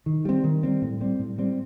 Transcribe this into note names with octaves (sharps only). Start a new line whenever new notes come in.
D#3
G3 C4
D#3
G3 C4
A2
G3 C4
A2
G3 C4